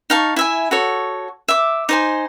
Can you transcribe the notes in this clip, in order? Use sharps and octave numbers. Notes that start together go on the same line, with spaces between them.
D#4 F5 A5 C#6
E4 E5 G#5
F#4 A4 C#5
E5 D6
D#4 C5 G#5